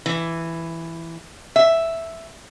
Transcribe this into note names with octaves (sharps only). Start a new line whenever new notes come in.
E3
E5